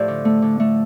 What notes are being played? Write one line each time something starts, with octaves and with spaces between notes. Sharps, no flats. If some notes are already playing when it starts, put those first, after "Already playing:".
Already playing: A2 F3 G4 A4 C5 D5
D3
A3
D3
A3